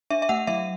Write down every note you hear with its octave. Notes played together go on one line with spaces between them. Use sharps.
D4 E5
E5
A3 F#5
F#3 E5